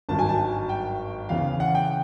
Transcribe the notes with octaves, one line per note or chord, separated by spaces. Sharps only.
G#1 G2 D#3 F#3 A5
G#5
A5
G5
E2 C#3 E3 F5
F#5
G5